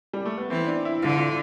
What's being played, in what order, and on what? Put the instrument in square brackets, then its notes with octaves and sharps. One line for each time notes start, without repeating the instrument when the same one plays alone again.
[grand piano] G3
A3
B3
[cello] E3 [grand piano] C4
[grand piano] D4
E4
[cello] D3 [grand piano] F4
[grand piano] F4